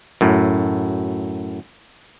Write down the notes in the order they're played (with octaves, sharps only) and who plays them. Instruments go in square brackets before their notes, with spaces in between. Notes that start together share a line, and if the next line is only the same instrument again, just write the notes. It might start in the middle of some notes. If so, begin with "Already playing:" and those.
[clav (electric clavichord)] F#2 A2